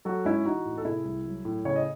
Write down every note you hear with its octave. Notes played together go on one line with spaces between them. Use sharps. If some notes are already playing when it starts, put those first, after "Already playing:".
F#3 F#4 A4
G#2 C#4 E4
E3 D#4 F#4
A2
A4
C3 E4 G#4
C2
F#3
A2
C#3 C#5
D#5